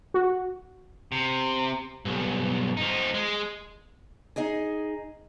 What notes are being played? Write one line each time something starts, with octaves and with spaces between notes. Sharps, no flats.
F#4
C3
B1 G2
F3 D#4
G#3
D#4 G#4 D#5 G#5